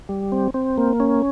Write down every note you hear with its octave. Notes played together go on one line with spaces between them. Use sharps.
G3
C4
C4
A#3
C#4